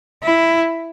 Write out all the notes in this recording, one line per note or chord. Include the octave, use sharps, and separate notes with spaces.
E4